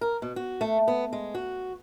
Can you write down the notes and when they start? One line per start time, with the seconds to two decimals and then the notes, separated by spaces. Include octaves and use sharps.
0.01 A#4
0.22 B2
0.36 F#4
0.61 A3
0.88 B3
1.13 G#3
1.35 F#4